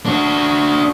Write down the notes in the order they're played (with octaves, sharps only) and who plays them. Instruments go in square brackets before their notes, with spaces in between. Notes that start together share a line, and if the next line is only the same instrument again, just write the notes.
[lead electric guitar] D4 F#4